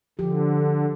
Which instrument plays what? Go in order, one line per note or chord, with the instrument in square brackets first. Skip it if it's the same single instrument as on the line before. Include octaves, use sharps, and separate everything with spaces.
[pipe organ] D3 [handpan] F3 G4